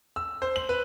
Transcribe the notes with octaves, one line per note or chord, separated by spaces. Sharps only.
E6
C5
F#7
B4